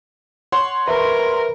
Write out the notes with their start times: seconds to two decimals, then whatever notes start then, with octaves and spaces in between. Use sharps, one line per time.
0.52 C#5 F#5 C6
0.88 A#4 B4 E5